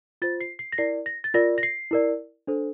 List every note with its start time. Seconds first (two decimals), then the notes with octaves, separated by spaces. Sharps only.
0.22 F4 C5 A6
0.41 C7
0.59 C7
0.72 A#6
0.78 E4 A#4 D5 C7
1.06 A#6
1.24 A6
1.34 F4 A#4 D5 A#6
1.58 A#6
1.63 C7
1.91 E4 A#4 D5
2.47 D4 A4 C5